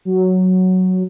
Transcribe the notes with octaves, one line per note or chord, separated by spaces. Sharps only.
F#3